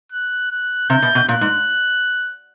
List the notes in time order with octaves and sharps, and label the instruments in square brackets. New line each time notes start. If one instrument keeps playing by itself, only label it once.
[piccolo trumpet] F#6
F#6
[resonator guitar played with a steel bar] C3 [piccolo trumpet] G6
[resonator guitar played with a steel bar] B2
B2
[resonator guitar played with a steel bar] A#2 [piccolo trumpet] F#6
[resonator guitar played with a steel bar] G#2